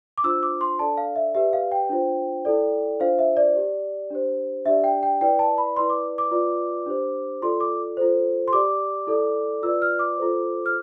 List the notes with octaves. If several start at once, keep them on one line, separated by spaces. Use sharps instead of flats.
D6
D4 F4 C5 E6
D6
C6
D4 A4 D5 A5
F5
E5
G4 B4 D5 E5
F5
G5
D4 F4 C5
E4 A4 D5
D4 F4 C5 F5
E5
D5
G4 D5
D4 G4 C5
D4 G4 D5 E5
G5
G5
E4 B4 D5 G5
A5
B5
E4 B4 D5 C6
D6
D6
F4 B4 D5
D4 G4 C5
F4 A4 D5 C6
D6
F4 A4 C5
C6
G4 D5 D6
E4 A4 D5
F4 B4 D5 E6
F6
D6
F4 A4 C5
F6